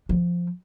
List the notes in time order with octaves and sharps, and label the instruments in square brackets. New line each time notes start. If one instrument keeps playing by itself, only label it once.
[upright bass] F3